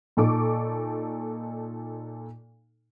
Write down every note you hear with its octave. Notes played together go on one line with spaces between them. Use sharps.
A#2 D#4 A4 C#6 D6